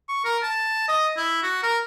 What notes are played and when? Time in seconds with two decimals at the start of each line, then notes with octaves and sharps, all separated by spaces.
0.09 C#6
0.25 A#4
0.43 A5
0.88 D#5
1.17 E4
1.43 F#4
1.63 A#4